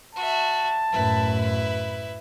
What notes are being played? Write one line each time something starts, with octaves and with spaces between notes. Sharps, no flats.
F#4 E5 A5
F#2 A2 E4 B4